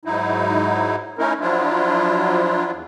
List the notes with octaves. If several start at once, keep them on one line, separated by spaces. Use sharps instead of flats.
G#2 F#3 D#4 E4
A3 C#4 D#4 E4 A#4
F3 F#3 D4 E4 F4
E2